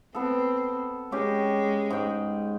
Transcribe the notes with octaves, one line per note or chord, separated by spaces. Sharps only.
B3 C4 A4
G#3 C#4 G4
G#2 G5